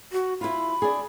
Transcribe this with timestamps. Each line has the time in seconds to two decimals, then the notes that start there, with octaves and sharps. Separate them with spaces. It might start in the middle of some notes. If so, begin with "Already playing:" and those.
0.12 F#4
0.41 E4 F4 B5
0.82 D4 G#4